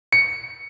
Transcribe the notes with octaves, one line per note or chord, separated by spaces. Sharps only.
C#7